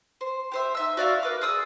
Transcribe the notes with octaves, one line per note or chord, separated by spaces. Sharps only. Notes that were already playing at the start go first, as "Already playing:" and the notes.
C5
G4 C5 E5
D#4 E5 E6
F#4 D5 E5 F5
A#4 B4 D6
G#4 D5 D#6 E6